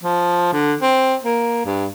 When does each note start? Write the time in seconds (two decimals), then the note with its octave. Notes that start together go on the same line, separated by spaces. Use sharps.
0.04 F3
0.53 D3
0.81 C4
1.24 A#3
1.66 G2